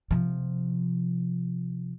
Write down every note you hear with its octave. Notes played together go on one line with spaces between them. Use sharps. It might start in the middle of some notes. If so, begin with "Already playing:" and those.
C3 F3